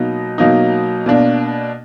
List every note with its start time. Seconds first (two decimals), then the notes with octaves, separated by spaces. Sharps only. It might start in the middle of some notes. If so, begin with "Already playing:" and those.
Already playing: B2 F#3 A#3 D#4
0.38 B2 F#3 A#3 D#4
1.06 B2 A#3 D4